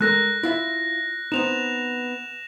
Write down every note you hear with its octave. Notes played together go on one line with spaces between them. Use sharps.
G#3 A4 A#4 F#6 A#6
E4 F4 E5
B3 C4 D#4 E7 F7